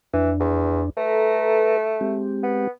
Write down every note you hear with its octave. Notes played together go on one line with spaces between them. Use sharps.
F2 E3 D4
E2
A3 A4 B4 A#5
G#3 C4 G4
B3